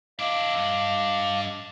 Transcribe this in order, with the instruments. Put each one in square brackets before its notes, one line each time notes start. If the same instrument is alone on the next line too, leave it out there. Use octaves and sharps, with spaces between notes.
[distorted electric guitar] D4 E4 [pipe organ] D#5 F5 D6
[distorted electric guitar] G2 D4